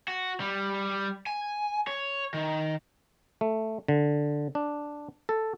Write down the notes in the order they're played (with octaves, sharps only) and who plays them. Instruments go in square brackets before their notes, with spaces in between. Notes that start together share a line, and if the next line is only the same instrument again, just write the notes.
[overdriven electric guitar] F#4
G3
G#5
C#5
D#3
[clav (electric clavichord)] A3
D3
D4
A4